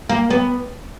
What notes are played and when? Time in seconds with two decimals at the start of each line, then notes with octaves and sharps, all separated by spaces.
0.09 A#3
0.30 B3